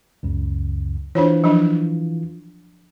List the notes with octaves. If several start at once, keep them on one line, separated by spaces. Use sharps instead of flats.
C#2 F#2 C#3
E3 D4 F4 C5 C#5
F3 F#3 D4